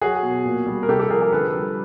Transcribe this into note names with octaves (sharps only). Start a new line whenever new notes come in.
F#3 F#4 G#4
B2
A#2
G3
A#4
C3 G4 A4
G4 A4
F3 G#4 A#4
G#4 A#4
D3 A4 B4
G3